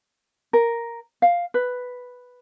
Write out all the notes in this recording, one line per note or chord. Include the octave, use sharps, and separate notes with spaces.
A#4
F5
B4